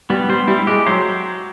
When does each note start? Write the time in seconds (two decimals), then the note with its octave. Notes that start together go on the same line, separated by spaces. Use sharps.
0.10 G3 B3
0.29 G3 C5
0.47 G3 E4
0.67 G#3 G4
0.86 F#3 C5